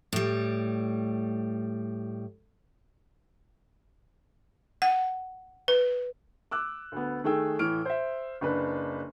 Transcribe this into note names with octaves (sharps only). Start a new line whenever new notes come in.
A2 G3
F#5
B4
D6 E6 F#6
D2 B3
D#3 A3 G#4 G5 E6
A2 E3 F6 D7
C5 E5
F#1 D4 B4